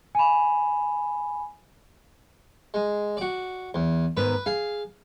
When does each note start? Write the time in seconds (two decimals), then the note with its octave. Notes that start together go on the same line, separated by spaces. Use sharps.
0.15 G#5 B5
2.74 G#3
3.17 F#4 D5
3.74 E2
4.17 G#2 D#3 B3 B4
4.46 G#4 F5